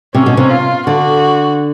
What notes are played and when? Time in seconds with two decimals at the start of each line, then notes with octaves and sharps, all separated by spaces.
0.15 C3 C#4
0.26 B2
0.37 C3
0.51 F4
0.87 D3 F#4